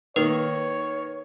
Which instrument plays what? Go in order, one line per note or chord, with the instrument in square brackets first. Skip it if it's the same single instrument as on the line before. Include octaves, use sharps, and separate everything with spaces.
[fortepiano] D#3 A#3 [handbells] B4 [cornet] C#5